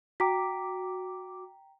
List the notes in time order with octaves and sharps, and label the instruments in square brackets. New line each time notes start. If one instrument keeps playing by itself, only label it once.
[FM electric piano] F#4 D6 [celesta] G5 A#5 B6